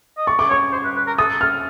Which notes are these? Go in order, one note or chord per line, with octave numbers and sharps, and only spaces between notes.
D#5
D5 C#6
D6
C#5 C#6
C5
B4
B4
A#4
A4 D#6
F6